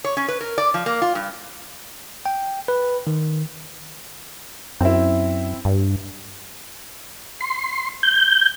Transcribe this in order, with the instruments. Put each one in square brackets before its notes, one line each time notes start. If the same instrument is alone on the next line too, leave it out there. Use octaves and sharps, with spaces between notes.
[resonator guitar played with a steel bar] C#5
C#4
B4
A#4
D5
F3
A#3
F4
G2
[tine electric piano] G5
B4
D#3
[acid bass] F#2 [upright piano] C4 E4
[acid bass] G2
[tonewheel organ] C6
G6